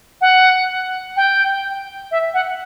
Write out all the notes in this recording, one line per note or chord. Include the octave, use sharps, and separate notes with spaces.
F#5
G5
E5
F#5